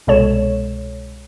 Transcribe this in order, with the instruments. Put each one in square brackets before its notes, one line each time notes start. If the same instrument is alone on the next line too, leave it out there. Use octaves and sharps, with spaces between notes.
[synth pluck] C2 B2 G#3 A4 C#5 E7